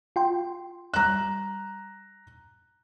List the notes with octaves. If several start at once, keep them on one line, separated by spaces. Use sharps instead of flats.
F4 G5 C6
G3 A#5 F#6 E7